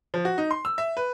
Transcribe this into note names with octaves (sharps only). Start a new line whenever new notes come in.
F3
F#4
D#4
C6
E6
E5
B4